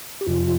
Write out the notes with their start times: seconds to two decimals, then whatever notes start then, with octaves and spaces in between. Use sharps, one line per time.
0.21 G4
0.26 F2 C3 F3 F4